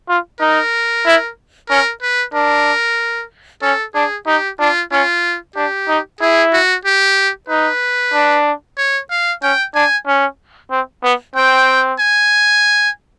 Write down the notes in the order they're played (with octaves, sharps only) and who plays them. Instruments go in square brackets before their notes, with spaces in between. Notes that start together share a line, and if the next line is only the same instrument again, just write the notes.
[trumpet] F4
[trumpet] D#4 [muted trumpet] A#4
[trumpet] E4
[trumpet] C#4 [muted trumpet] A#4
[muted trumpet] B4
[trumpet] D4 [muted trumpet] A#4
[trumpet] C#4 [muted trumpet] A4
[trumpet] D4 [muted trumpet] G#4
[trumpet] D#4 [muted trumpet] G4
[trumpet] D4 [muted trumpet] F4
[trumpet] C#4 [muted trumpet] F4
[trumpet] D4 [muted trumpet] G4
[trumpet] D#4
[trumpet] E4 [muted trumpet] G#4
[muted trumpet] F#4
G4
[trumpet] D#4 [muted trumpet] B4
[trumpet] D4
[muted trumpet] C#5
F5
[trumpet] C#4 [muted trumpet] G5
[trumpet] D4 [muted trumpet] G#5
[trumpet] C#4
C4
B3
[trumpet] C4 [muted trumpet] G5
[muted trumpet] G#5